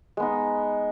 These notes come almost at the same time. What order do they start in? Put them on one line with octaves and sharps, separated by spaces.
G#3 B3 D#4